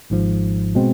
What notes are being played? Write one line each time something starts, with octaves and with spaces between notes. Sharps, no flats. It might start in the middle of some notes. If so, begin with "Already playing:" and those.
G#1 G#2 F3
B2 G#3 C4